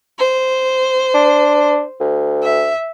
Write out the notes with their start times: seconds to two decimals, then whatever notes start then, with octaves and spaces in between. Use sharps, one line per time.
0.19 C5
1.14 D4
2.00 D2
2.43 E5